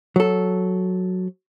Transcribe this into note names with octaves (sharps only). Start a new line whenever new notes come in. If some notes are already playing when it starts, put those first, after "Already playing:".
F#3 A4